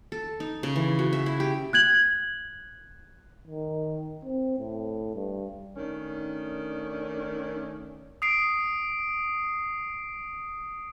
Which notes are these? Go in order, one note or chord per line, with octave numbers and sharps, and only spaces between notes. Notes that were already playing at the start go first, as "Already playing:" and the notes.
A4
D#4
C#3
E3
F#4
E5
E4
G4
F#6 G#6 F#7
D#3
C4
A2
G2
D#3 A3 C#4 D4
D#6 C7 D7